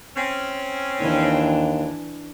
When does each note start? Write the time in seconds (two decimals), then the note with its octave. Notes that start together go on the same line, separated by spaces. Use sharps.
0.16 C4 C#4
1.00 D#2 E3 D4